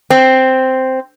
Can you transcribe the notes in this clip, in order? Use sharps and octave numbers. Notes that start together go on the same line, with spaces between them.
C4